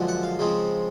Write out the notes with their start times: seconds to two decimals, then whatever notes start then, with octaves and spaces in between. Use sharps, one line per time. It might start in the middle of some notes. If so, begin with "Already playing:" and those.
Already playing: F#2 D3 F3 G#3
0.08 F#5
0.23 F5
0.39 C#3 F3 G#3 C4